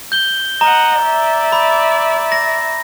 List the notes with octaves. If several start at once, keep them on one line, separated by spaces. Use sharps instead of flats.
G6 G7
D#5 F#5 A#5
D5 E5
B5
A#6